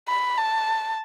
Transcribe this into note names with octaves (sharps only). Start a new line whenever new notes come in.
B5
A5